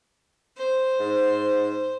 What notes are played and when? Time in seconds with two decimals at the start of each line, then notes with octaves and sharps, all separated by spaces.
0.58 C5
1.00 G#2